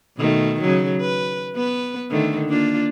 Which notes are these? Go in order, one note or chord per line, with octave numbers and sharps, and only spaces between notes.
B2 D#3 A3
C#3 F#3
B4
B3 B4
D3 D#3 A3
A#3 D4 F4